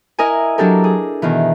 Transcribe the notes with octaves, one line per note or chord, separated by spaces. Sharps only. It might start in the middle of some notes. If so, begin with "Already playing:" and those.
E4 A#4 D#5 G#5
F#3 D4 G4 A4 A#4
G#4
B2 D#3 E3